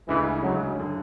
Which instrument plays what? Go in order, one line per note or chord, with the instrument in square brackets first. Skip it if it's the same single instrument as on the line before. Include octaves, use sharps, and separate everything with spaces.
[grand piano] D2 C#3 G#3 [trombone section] E3
[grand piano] D2 C#3 G#3 [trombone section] F#3
[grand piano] F#1 D3